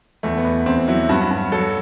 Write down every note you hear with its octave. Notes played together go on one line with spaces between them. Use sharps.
E2 A3
B3
E2
E2 C4
F#3 E4
G2 F#4
G2
F#3 A4